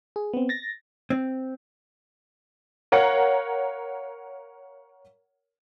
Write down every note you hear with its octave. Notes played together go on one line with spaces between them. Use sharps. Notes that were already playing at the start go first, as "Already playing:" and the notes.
G#4
B3 C4
A6 A#6
C4
A#4 C#5 F5 F#5